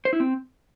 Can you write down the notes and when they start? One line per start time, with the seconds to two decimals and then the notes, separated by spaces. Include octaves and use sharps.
0.05 C5
0.13 E4
0.20 C4